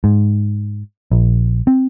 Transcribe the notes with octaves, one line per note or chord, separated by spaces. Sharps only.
G#2
A#1
C4